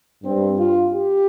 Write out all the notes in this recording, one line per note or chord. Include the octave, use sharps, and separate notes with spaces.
G2 G3 C4
F4
G4